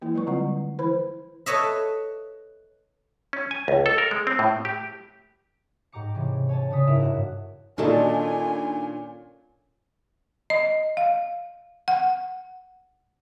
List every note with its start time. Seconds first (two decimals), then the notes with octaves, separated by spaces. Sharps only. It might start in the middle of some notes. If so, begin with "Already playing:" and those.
0.02 E3 A#3 E4
0.14 F#3 G#3 B4 C#6
0.27 D3 G3 G#3 C4 F4 F#5
0.79 E3 E4 B4 C5 B5
1.46 A4 B4 C#5 D#5 E5
3.33 C#4
3.51 G#5
3.68 C#2
3.86 A4
3.98 A#4
4.11 G#3
4.27 C4
4.39 A2
4.65 G4
5.92 G#2 G4 A#5 D6 C#7
6.15 C3 E3 C#4
6.49 C#5 G#5 A5
6.71 C#3 D4 C#5 D#6 B6
6.87 F#1 G#2 E4 A#4 E5
7.00 G2 F#4 F#6
7.78 A#2 D#3 C#4 D4 F#4 A4 D#5 G#5
10.50 D#5
10.97 F5
11.88 F#5